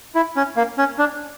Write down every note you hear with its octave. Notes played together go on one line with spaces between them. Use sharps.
E4
C#4
A#3
C#4
D4